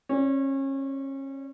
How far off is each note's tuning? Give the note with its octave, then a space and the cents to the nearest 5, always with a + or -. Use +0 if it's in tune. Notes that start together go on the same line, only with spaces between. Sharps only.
C#4 -30 D5 -45